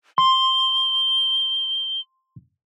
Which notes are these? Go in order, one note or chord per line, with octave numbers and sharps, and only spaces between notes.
C6 G7